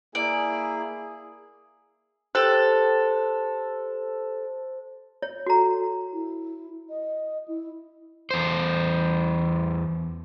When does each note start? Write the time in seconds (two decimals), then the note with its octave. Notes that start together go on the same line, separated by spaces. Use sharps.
0.15 A#3 E4 G#4 D5
2.35 G4 A4 C5 F#6
5.22 C#5
5.46 F#4 A4 A#5
6.13 E4
6.89 D#5
7.48 E4
8.31 E2 C5